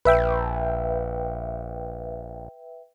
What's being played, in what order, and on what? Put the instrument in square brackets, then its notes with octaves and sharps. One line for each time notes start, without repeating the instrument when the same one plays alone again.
[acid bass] A#1 [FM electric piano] B4 E5 G5